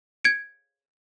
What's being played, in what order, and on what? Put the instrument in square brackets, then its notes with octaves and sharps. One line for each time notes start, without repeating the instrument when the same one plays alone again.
[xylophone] G#6 C#7 D7